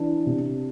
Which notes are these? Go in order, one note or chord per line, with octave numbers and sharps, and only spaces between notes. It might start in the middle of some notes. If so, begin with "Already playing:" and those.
Already playing: E3 D4
C3